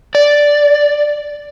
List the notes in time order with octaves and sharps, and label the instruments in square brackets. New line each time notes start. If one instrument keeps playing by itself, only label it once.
[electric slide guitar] D5